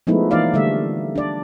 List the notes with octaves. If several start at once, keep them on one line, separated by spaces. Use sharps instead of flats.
F3 G#3 A3 B3 D#4 E4
E3 A#3 D#4 D5 F5
D3 G3 A3 E5
D4 D5